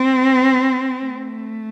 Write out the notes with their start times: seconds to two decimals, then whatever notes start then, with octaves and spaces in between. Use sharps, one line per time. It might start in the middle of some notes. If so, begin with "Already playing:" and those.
Already playing: C4
1.04 A3